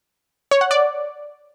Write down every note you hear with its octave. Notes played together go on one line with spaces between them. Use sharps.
C#5
F#5
D5